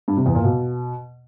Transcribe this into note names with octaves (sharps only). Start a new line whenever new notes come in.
G2
C3
E2
A#2
B2